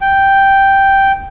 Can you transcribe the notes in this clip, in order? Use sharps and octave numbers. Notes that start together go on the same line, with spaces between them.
G5